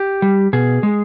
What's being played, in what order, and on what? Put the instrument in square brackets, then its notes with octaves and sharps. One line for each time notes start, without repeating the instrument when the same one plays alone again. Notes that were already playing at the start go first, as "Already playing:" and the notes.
Already playing: [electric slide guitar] G4
G3
B2 G#4
G#3